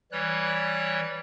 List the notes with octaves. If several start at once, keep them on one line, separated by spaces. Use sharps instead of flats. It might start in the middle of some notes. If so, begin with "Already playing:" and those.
E3 G3 C#5 F#6